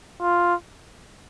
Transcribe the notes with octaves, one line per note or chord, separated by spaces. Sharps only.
F4